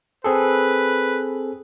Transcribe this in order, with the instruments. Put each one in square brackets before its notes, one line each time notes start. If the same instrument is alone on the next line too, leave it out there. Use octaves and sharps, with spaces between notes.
[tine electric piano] C4 G#4 A4 [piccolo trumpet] B4